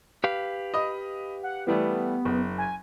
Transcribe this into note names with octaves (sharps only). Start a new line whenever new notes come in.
G4 B4 F5
D#5 B5 D#6
F#5
E3 G3 A3 B3
F#1
G#5